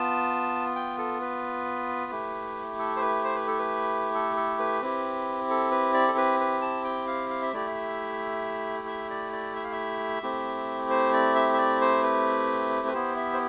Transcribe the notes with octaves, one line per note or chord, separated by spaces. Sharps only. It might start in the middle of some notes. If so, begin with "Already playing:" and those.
Already playing: B3 F4 A5
G5
A4
B4
A3 E4 G4
A4
C5
B4
C5
B4
A4
B4
A4
A4
B4
C4 E4 G4
A4
B4
D5
A4
B4
B4
A5
G5
F5
F5
E5
A3 E4 G4 D5
E5
E5
D5
D5
E5
F5
E5
A3 C4 E4 G4
C5
D5
E5
E5
D5
C5
B4
B4
B3 E4 G4 C5
E5
C5